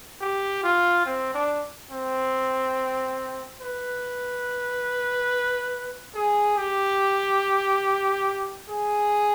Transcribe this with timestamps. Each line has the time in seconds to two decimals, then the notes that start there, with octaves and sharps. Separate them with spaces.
0.21 G4
0.63 F4
1.06 C4
1.34 D4
1.91 C4
3.61 B4
6.15 G#4
6.57 G4
8.70 G#4